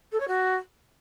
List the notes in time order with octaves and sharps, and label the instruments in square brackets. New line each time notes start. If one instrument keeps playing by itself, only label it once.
[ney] A4
C#5
F#4